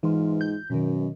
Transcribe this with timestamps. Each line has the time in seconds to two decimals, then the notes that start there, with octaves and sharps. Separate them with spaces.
0.03 G#2 E3 F4
0.41 G6
0.70 F#2 B2 D#3